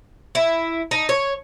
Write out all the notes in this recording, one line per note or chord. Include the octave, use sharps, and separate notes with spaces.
E4
D#4
C#5